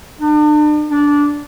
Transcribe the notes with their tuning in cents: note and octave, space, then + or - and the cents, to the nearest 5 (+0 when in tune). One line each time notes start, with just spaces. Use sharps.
D4 +40
D4 -15